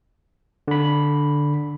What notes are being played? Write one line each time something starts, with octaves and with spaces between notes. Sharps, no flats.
D3 B5